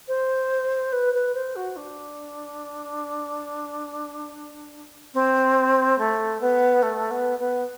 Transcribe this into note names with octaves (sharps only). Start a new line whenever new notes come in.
C5
B4
B4
C5
F#4
D4
C4
A3
B3
A3
B3
B3